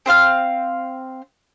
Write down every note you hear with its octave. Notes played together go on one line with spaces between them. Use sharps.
C4 C5 F5 F6